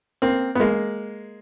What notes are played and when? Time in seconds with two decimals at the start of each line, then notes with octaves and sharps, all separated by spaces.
0.22 A#3 C4
0.55 B3
0.60 G#3 A#3